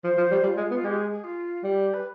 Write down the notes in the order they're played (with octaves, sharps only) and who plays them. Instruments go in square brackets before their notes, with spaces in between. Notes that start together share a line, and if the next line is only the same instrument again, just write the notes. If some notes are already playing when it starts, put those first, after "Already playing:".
[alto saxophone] F3 [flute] C5
[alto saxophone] F3
G3
[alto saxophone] G3 [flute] F4
[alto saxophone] G#3
B3
[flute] F4
[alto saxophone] G#3 [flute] G4
[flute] G#4
G#4
F4
[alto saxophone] G3 [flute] G4
[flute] B4